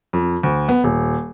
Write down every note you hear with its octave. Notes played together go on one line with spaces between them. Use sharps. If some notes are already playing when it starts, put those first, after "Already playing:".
F2
D2
B3
D#1